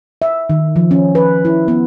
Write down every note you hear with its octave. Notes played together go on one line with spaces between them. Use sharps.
E5
D#3
F3
C#4
B4
E4
B3